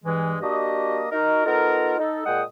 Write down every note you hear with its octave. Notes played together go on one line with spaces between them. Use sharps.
G2 E3 G#3
A#3 D4 F#4 G4 D#5
D#4 F#4 A#4
B3 D#4 F4 A4 A#4
D#4 A4
A#2 G#3 G#4 F#5 G5 D#6